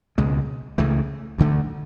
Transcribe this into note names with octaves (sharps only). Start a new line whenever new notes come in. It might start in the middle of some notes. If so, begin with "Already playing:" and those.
C#2 B2 G#3
C#2 C#3 E3 A3
D2 D3 A3